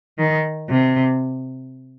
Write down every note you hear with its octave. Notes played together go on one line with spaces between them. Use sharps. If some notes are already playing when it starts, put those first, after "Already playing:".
D#3
C3